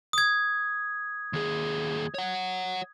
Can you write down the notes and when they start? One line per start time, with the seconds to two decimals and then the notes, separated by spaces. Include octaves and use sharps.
0.13 D#6 G#6
1.33 D#2 G#4
2.14 C#5 F#5